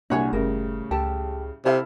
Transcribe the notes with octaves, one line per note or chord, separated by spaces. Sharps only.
C2 A#2 D4 G#4 C#5 F#5
F#1 A2 C#3 G3 A#4
C#2 G4 A4 A5
C3 E4 A4 F5